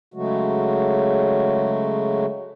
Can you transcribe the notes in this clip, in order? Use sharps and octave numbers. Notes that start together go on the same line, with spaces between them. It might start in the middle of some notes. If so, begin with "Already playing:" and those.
C#3 F#3 G#3 A3 F#4